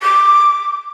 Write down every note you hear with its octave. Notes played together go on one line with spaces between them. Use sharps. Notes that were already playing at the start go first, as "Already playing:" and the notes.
D6